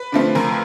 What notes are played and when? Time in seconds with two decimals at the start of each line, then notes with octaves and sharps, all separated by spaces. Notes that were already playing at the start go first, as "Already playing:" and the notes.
Already playing: B4
0.12 D3 F3 A3 C4
0.35 F2 A#4